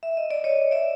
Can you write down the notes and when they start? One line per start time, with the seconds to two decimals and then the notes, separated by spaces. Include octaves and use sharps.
0.03 E5
0.17 D#5
0.31 D5
0.44 C#5 D#5
0.71 D5 E5